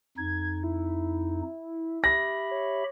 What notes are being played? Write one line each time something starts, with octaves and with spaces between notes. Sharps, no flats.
F2 D#4 G#6
E4
G4 E5 B5 A#6
C#5